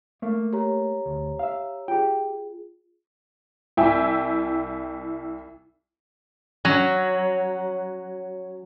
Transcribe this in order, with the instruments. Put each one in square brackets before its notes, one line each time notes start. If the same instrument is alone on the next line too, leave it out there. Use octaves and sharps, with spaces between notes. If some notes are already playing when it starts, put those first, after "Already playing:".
[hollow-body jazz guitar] A3 A#3
[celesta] G4 C#5 A#5
[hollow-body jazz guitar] D2
E5 F5
[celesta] F4 G#4 [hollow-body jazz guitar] G4 G5
[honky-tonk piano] C2 E4 E5 G5 G#5 E6
[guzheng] F#3 [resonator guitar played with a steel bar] C#4